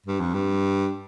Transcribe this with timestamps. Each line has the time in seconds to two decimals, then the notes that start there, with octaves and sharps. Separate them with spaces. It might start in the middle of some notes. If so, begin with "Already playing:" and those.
0.07 G2
0.20 F2
0.34 G2